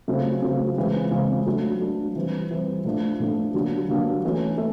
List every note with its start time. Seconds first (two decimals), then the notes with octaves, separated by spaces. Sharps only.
0.08 C#3 F#3 A3 C4 F4
0.42 C#3 F#3 A3 C4 F4
0.76 C#3 E3 G#3 C4 F4
1.11 C#3 E3 G#3 C4 F4
1.46 F#3 A3 D4
1.80 F#3 A3 D4
2.16 E3 G3 C4
2.51 E3 G3 C4
2.85 A2 F3 A3 D4
3.20 A2 F3 A3 D4
3.54 D3 F#3 A#3 D4 G4
3.89 D3 F#3 A#3 D4 G4
4.24 E3 A3 C#4
4.58 A3